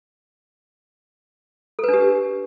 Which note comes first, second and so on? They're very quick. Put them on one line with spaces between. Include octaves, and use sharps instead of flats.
A4 B4 D4 G4